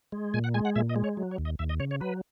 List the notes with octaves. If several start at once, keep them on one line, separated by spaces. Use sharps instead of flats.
G#3
A#2 G#5
F#5
G#3 G#5
F#5
A#2 E5
D#5
G#3
C#5
F#3
C#5
D#2
D#5
D#2 E5
D#5
C#3 C#5
C#5
F#3 B4